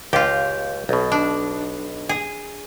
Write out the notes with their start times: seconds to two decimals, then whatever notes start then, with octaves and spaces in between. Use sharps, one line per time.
0.13 C#2 F4 G4
0.89 B1 B2
1.12 D4
2.09 G#4